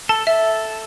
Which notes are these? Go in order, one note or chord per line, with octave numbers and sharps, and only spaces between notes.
A4 A5
A4 E5